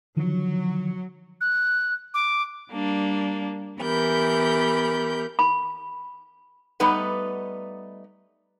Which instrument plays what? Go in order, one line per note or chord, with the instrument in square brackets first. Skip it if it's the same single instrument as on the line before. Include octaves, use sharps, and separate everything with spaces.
[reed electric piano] D3 D#3 F3 [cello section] F#3
[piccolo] F#6
D6
[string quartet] G3 A#3 D4
E3 B3 G4 A#4 B5 G6
[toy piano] B5
[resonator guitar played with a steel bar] G3 A3 B3 D#4 B4 F#5